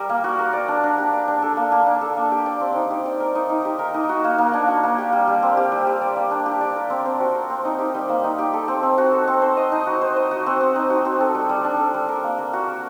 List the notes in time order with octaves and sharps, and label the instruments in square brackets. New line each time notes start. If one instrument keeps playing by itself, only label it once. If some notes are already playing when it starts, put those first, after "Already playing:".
Already playing: [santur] G3 A#4
A#3
F#4
A#4
D5
D4
D4
G4
D5
D4
A4
A#3
A#3
D4
A4
A#3
G4
D5
C4
D#4
G4
D5
A#4
D#4
D#4
G4
A#4
D#4
F#4
A#3
A#3
D4
F#4
A#3
G4
G3
G3
C4
G4
G3
G4
D5
A#3
D4
G4
D5
A#4
C4
C4
F#4
A#4
C4
D#4
G4
G3
A#3
D#4
G4
A4
C4
C4
F#4
A4
C4
C5
D#5
D#4
F#4
C5
D#5
F#4
C4
C4
D#4
F#4
C4
A4
G3
G3
D4
A4
G3
A#4
A#3
A#3
F#4
A#4